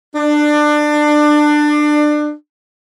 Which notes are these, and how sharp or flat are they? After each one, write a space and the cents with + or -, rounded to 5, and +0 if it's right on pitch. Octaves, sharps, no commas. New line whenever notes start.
D4 +25